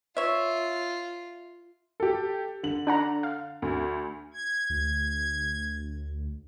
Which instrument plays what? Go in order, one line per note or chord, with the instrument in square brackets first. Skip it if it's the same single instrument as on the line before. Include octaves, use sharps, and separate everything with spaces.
[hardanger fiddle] F4 [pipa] C#5 E5
[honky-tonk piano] G4 A4
D3 F#7
[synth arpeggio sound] D4 F#5 A#5
F5
[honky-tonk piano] D2
[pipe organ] G#6
[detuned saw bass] D2